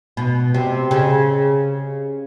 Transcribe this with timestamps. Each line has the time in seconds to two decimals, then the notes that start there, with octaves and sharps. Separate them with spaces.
0.17 B2
0.54 C3
0.91 C#3